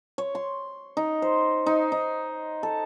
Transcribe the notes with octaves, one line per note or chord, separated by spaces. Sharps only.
C#5
C6
D#4
C5
D#4
D#4
A4